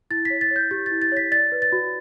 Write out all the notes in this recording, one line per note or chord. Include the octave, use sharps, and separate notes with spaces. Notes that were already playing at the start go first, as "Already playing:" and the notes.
E4 A6
B6
C#5
A6
C#5 G6
G4 A6
A6
E4
A6
C#5 B6
D5 A6
B4
A6
F#4